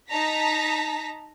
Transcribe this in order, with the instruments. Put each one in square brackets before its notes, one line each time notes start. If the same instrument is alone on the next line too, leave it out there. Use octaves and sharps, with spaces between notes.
[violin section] D#4 A5 A#5 A#6 B6